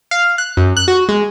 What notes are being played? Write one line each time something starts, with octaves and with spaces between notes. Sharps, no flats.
F5
F#6
F#2
F#6
F#4
G#3